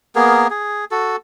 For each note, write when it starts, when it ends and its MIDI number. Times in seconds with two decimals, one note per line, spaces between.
0.15 0.47 58
0.15 0.47 59
0.15 0.47 68
0.15 0.47 70
0.50 0.85 68
0.91 1.16 66
0.91 1.16 69